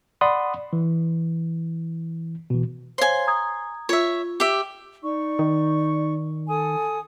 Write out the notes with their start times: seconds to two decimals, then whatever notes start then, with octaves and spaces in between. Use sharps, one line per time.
0.21 D5 F#5 B5 C6 D#6
0.73 E3
2.50 B2 E3
2.98 C5 C#5 F5 G#5 C6
3.27 A#5 D#6 G#6
3.89 F4 C#5 E5
4.40 G4 E5
5.03 D#4 D5 C#6
5.39 D#3
6.47 A4 G#5 D#6